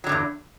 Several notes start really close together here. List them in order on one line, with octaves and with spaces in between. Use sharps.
F#3 D3 G2 E2